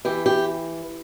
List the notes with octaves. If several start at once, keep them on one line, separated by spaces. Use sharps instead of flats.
E3 G4
G4